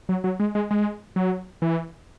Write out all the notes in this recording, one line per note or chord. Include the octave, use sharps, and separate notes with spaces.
F#3
F#3
G#3
G#3
G#3
F#3
E3